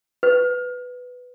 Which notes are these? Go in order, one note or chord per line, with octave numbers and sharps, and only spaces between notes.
B4